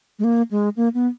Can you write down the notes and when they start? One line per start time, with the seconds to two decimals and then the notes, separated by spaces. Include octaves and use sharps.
0.19 G#3
0.24 A#3
0.51 G#3
0.76 A#3
0.94 B3